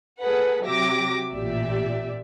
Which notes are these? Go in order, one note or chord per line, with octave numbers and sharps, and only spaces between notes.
A#3 G#4 A4 B4 F#5
C3 F#3 G4 E5 D6 A#6
A1 A#2 G4 D5 E5